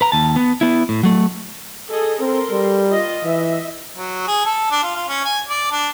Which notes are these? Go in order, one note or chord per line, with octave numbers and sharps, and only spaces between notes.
B4 A#5
D#2 A5
B3
B3 E4
A2
F#3 A3
G#4 A4 D#5
C4 A4 A#4 C6
G3
F4 D#5
E3 D#5 E5
F#3
G#4
A4
D4
F4
F4
C#4
G#5
D5
D4